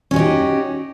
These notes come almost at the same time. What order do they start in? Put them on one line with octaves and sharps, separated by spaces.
C#4 F#4 D#4 G4